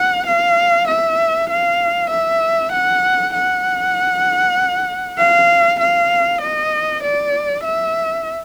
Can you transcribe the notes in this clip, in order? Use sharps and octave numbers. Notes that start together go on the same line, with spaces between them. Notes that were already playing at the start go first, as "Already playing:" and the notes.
Already playing: F#5
F5
E5
F5
E5
F#5
F#5
F5
F5
D#5
D5
E5